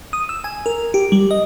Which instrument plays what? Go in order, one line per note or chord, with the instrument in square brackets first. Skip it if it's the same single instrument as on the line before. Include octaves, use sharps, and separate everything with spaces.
[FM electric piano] D#6
E6
G#5
A#4
G4
G3
D#5